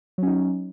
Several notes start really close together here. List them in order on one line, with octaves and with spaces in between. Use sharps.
F#3 C#4 D#4